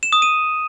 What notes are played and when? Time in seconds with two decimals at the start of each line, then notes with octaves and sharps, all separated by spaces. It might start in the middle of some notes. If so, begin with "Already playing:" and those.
0.03 E7
0.13 D#6
0.22 D#7